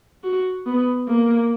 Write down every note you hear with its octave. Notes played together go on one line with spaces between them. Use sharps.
F#4
B3
A#3